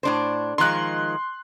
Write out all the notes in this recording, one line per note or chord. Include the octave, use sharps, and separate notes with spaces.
A2 D4 C5
D#3 F3 G#3 C6 F#6